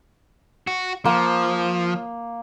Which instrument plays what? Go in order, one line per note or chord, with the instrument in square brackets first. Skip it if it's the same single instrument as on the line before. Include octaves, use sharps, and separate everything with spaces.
[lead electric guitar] F#4
[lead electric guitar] F3 [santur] A#3